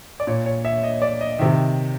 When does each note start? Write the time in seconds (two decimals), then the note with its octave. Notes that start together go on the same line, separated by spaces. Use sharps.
0.20 D5
0.27 A#2 C#5
0.46 C#5
0.65 E5
0.83 D#5
1.02 D5
1.21 D#5
1.39 C3 D#3 E5